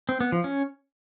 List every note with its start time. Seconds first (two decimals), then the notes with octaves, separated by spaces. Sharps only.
0.09 C4
0.21 B3
0.32 F3
0.44 C#4